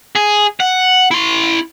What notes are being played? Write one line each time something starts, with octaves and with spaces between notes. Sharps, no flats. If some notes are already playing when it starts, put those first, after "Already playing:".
G#4
F#5
E4 C6